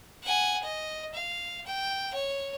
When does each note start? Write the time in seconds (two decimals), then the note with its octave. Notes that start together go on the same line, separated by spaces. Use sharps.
0.23 F#5 G#5
0.62 D#5
1.14 F5
1.66 G5
2.13 C#5